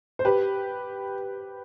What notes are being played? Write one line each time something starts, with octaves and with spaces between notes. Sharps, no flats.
C5
G4 B4